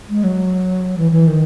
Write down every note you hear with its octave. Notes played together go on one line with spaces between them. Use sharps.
G#3
F#3
E3
E3
D#3